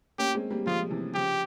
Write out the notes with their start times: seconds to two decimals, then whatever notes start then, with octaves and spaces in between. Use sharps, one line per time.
0.19 A#3 C#4 G4
0.35 G#3 C4
0.50 G3 A#3
0.66 F3 G#3 F4
0.90 C3 E3
1.14 C#3 F3 G4